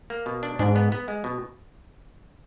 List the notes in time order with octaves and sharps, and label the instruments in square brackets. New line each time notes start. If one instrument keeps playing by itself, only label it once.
[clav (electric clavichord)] A#3
B2
D4
[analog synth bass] G#2 [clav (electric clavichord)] D4
[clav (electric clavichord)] B3
B3
G#3
B2